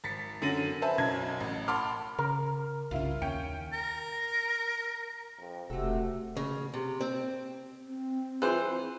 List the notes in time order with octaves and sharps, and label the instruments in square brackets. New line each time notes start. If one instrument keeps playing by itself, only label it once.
[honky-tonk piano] G#1 A6 B6 C#7
F#2 D3 A6 A#6 D#7 F#7
B4 C5 E5 G#5 A5
B1 F#2 G#6
A1
F#5 A5 B5 C6 D6 F6
[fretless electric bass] C#3 [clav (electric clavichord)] A#4
[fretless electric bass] C2 G2 C#3 [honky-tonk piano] E4 F4 F5
[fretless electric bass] D#2 [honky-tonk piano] C#4 G5 C#7
[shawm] A#4
[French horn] F2
[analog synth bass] E1 [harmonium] C3 [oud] A3 A4 [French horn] F#4
[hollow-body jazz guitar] C#3
C3
C4
[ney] C4
[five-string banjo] E3 C5 [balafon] F4 G#4